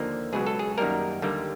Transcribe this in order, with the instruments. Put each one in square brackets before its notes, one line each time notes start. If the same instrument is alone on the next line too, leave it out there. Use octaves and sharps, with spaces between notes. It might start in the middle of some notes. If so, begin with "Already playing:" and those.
Already playing: [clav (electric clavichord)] D#2 D3 F3 A#3
C#2 B2 F#3 G#4
A4
G#4
F#2 D#3 G3 A#3 A#4
D#2 D3 G3 A#3